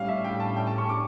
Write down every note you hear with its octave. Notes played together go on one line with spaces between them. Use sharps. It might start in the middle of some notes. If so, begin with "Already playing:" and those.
Already playing: A2 G3 C#4 F5
E5
G5
A5
G5
A5
C#6
D6